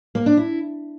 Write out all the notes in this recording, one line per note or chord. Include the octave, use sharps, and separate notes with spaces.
A#3
D4
E4